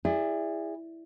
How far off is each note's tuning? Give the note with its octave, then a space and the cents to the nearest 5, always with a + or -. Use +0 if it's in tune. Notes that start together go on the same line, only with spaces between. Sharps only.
E4 +0 G#4 -35 D5 +0